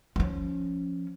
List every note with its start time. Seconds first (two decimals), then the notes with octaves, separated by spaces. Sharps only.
0.16 F3 C#4